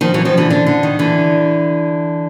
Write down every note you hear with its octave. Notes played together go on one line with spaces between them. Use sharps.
D#3 F3
E3 F#3
D#3 F3
D3 E3
D3
D3
D#3
D3 E3